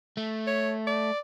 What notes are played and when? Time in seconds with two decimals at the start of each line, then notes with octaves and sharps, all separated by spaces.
0.17 A3
0.47 C#5
0.87 D5